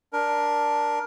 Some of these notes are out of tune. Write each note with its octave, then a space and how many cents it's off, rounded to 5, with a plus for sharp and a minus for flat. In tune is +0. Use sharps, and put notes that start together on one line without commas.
D4 +0 A#4 +15